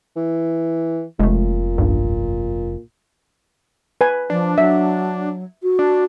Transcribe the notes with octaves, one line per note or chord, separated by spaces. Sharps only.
E3
F1 A#2 G#3 A3
B1 E2 G2
B4 G#5
F3 D4
F#3 E5
F#4
D4